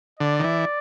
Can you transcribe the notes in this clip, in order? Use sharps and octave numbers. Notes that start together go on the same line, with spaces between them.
D3 D5
D#3
E3